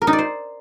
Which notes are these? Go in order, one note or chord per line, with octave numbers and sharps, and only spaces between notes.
A#4
D#4
D5
C5